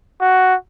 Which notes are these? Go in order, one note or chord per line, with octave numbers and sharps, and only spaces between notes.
F#4